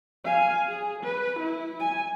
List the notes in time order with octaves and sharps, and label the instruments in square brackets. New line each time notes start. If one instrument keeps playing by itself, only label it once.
[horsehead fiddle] F5 G#5
G#4
B4
E4
G#5